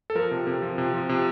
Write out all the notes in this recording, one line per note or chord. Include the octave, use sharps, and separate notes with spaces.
A4
F3 A#4
C3
C3
F3
C3
F3
C3